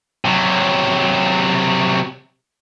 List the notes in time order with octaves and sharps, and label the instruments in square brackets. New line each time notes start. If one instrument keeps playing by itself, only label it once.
[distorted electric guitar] C3 F#3